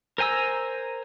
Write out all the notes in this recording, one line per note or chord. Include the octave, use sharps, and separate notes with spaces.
A#4 C5 G#5 A#5 E6